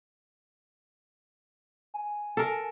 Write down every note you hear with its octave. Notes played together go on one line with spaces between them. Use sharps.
G#5
A4 A#4